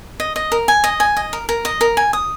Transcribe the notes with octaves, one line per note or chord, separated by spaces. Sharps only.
D#5
D#5
A#4
G#5
D#5
G#5
D#5
A#4
A#4
D#5
A#4
G#5
D#6